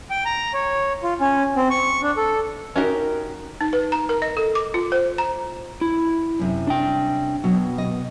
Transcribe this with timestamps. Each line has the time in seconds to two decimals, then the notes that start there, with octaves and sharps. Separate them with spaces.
0.10 G5
0.25 A#5
0.54 C#5
1.03 F4
1.21 C#4
1.56 C4
1.71 C#6
2.02 D4
2.17 A4
2.76 C#4 D#4 F#4 G4 A#4
3.61 D#4
3.73 B4
3.92 A#5
4.09 A#4
4.22 D#5
4.37 A4
4.55 D6
4.74 F4
4.92 C5
5.18 A#5
5.81 E4
6.39 F#2 C3
6.67 D4 G5
7.44 B2 F#3
7.78 D#5